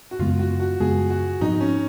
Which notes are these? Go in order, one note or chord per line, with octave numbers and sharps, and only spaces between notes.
F#4
F#2 C#3 G#3 B3 F4
F#4
F#4
F#2 C#3 G#3 B3 G#4
F#4
G#2 F3 B3 D#4
C#4